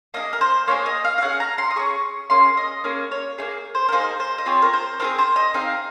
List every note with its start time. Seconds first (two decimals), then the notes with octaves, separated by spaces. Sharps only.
0.14 A#3 D#4 G#4 D#5
0.33 A#4
0.41 C5
0.68 A#3 D#4 G#4 C#5
0.86 D#5
1.04 F5
1.18 F5
1.22 C#4 G#4 F#5
1.40 A#5
1.58 C6
1.71 D#6
1.76 C#4 G#4 C#6
2.30 A#3 C#4 G#4 C6
2.57 D#5
2.84 A#3 C#4 G#4
3.11 C#5
3.38 A#3 D#4 G#4
3.75 C5
3.88 A#4
3.92 A#3 D#4 G#4 C5
4.20 C5
4.38 D#5
4.46 C4 F4 G#4 C#5
4.62 A#4
4.73 C5
5.00 C4 F4 G#4 A#4
5.19 C5
5.36 D#5
5.54 C4 D#4 G#4 F5